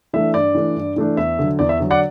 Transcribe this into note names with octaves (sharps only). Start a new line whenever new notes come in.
E3 A3 D4 E5
G2 D5
E3 A3 D4
G2
E3 A3 D4
E2 E5
D3 F#3
E2 D5
E5
D3 F#3
D5 F#5